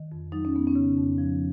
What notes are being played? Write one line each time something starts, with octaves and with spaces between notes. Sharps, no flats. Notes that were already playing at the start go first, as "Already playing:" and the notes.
Already playing: D#3
F2
F#3 D#4
C#4
F2 B3
C#4
C#3
F2
F3